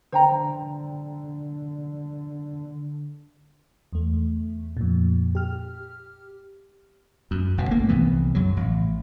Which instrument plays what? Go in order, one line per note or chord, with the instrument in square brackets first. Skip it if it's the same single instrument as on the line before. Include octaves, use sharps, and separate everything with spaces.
[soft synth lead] D3 [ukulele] C5 G5 A#5
[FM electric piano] E2 A3
F2 A#2
G4 F6
[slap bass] F#2
G1 B2
A3 A#3
C2 C3 E3 B3
F#2 C#3 F#3
A1